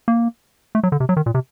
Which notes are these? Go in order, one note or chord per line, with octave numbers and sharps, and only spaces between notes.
A#3
A3
F#3
D3
C3
F#3
D#3
A#2
C3